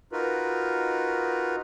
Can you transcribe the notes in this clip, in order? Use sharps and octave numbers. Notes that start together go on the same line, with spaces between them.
D#4 F4 F#4 A#4 B4